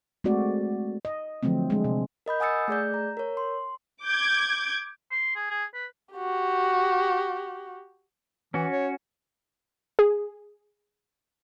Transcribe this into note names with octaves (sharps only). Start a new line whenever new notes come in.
G#3 A3 C4 F#4 D5
D#5
D3 F3 F#3 A3 C4
G#3 D4
C3
A#4 D#5 B5 G6
F#5 G#5 D#6 E6 A6 C#7
A3 G#4 D5 G6
A#5
A#4 C#5
C6
D6 G6 G#6
C6
G#4
G#4
B4
F#4 G4
E3 C#4 F#4
C#5
G#4